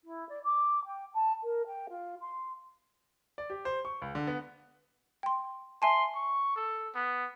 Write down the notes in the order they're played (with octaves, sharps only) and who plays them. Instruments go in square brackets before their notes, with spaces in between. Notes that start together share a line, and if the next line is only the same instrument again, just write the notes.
[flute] E4
D5
D6
G5
A5
A#4
G5
F4
C6
[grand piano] D5
G4
C5
C#6
C#2
D3
B3
[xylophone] G5 C6
[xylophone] E5 G#5 A5 [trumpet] C6
[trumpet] C#6
A4
B3